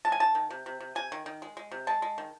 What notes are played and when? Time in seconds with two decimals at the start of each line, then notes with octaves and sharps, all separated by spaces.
0.05 G#3 A5
0.12 G#5
0.20 D#3 A5
0.35 D#3
0.50 C3
0.66 C3
0.80 C3
0.95 C3 G#5
1.12 D#3
1.26 D#3
1.42 G#3
1.57 G#3
1.72 C3
1.87 G#3 A5
2.02 G#3
2.18 D#3